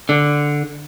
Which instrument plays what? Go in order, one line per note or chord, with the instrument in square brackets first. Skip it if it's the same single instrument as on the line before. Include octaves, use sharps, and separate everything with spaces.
[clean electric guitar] D3